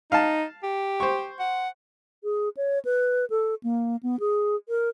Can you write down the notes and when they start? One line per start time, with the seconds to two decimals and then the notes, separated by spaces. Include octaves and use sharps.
0.12 D#4 F5 A5
0.63 G4
1.00 C5 C#6
1.39 F#5
2.24 G#4
2.57 C#5
2.85 B4
3.30 A4
3.63 A#3
4.03 B3
4.20 G#4
4.69 A#4